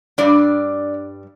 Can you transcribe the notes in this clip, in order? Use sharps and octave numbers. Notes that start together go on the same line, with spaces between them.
G2 G3 D4 D5